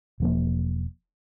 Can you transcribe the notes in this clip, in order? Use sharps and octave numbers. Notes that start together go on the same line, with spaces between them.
E1 F3 A#3